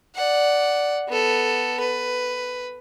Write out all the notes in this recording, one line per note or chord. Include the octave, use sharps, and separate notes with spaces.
D5 F#5
B3 A4
B4